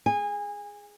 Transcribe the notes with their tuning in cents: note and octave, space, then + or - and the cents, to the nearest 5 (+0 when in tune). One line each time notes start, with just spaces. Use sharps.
G#4 +0 G#5 -25